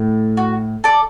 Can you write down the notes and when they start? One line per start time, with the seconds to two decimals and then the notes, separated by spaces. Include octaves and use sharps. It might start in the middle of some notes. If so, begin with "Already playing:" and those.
Already playing: A2
0.37 F#4
0.84 A4 D5